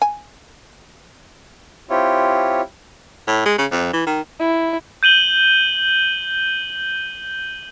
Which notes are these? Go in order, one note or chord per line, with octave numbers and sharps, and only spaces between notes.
G#5
C4 E4 F4 G4 C#5
A2
G#3
C#3
F2
E3
D#3
E4
G6 D#7 F#7 G7